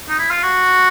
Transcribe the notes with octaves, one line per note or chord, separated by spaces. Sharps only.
D#4
E4
F4
F#4